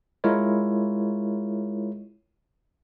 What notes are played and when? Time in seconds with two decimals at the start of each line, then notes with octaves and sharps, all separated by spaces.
0.24 G#3 E4 F4 A#4 C#5